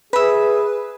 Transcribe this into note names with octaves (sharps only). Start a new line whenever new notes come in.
G#4 B4 E5 B5